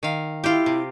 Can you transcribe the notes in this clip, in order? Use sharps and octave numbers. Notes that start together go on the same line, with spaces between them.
D#3 F5
E4 F4 G4
C3